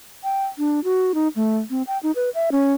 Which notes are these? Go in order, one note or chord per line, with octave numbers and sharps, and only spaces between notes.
G5
D4
F#4
D#4
A3
C4
G5
D#4
B4
E5
C#4